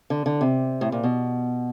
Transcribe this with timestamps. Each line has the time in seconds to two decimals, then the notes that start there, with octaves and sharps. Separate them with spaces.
0.10 D3
0.26 D3
0.41 C3
0.81 A2
0.92 A#2
1.04 B2